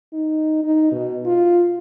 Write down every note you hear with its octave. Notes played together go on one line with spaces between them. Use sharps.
D#4
D#4
B2
F4